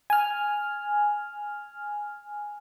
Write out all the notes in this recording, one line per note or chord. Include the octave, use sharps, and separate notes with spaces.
G#5 F6